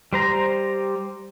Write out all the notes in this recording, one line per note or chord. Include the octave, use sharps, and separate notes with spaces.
G3 C5 A#5